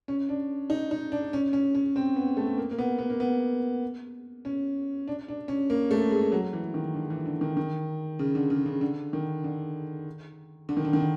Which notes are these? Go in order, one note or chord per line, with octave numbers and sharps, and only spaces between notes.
C#4
D4
D#4
D#4
D4
C#4
C#4
C#4
C4
B3
A3
A#3
A#3
B3
B3
A#3
B3
C#4
D4
D4
C#4
A#3
A3
G#3
F#3
E3
D#3
D3
E3
D3
D#3
D#3
C#3
D3
C#3
C#3
D3
D#3
D3
D3
D#3
D3
D#3
D3